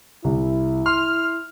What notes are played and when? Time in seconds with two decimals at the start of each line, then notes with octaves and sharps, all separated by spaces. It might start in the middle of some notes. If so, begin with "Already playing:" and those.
0.24 C2 E4
0.86 C6 F6